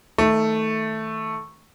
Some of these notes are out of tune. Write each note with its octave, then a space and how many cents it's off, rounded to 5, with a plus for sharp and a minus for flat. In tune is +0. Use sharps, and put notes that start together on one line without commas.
D#3 +30 A3 +0